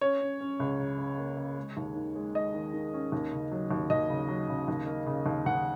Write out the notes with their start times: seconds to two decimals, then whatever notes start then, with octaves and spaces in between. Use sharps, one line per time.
0.01 C#4 C#5
0.21 C#4
0.41 C#4
0.60 C#2
0.80 C#3
0.98 C#3
1.18 A#3
1.37 C#3
1.57 G#3
1.77 D#2
1.95 D#3
2.15 G#3
2.35 G#3 D#5
2.54 D#3
2.73 D#3
2.93 C#4
3.12 D#2
3.32 C#3
3.51 F#3
3.71 D#2
3.90 D#2 D#5
4.10 C#3
4.28 F#3
4.49 C#3
4.68 D#2
4.87 A#3
5.06 C#3
5.26 D#2
5.46 D#2 F#5